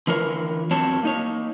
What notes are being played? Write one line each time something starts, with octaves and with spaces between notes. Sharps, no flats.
D3 E3 F4 A#4 C#5
E2 F#3 C4 C#5 A5
A#3 D#4 C#5